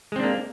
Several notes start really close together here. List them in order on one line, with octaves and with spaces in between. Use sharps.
G#3 C4 D4 A#3